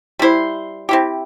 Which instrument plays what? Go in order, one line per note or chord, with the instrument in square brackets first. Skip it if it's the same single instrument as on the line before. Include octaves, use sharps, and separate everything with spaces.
[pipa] G3 E4 C5
C4 E4 G4